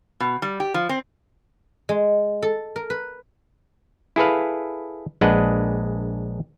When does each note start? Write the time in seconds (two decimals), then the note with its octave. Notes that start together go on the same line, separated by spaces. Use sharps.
0.20 B2
0.42 G3
0.60 G4
0.74 F3
0.89 C4
1.89 G#3
2.42 A4
2.76 A#4
2.90 B4
4.16 E4 G#4 A4 B4 F5
5.21 A#1 G#3 D4 B4 D#5 F#5